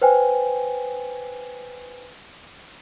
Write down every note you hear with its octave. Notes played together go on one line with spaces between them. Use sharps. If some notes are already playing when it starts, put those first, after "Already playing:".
B4 C5 G5 G#5